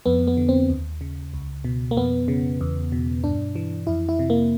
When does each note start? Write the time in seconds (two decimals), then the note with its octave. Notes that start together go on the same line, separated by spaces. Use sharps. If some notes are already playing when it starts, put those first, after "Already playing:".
0.06 F2 B3
0.27 B3
0.37 D3
0.49 C4
0.69 D#2
1.01 C#3
1.33 C#2
1.64 B2
1.91 A#3
1.97 F2 B3
2.28 C#3
2.61 E2
2.92 B2
3.24 G2 D4
3.56 E3
3.87 F2 E4
4.09 E4
4.19 C3
4.30 A#3